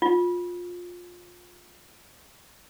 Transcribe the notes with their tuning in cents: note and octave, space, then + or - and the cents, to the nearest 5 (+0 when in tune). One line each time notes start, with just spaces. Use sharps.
F4 +20